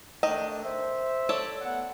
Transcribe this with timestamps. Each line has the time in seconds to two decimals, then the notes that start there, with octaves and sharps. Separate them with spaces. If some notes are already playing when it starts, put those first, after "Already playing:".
0.23 D#3 A3 D4 D#5
0.62 C5 E5
1.29 A4 C#5 D5
1.61 A3 B3 F#5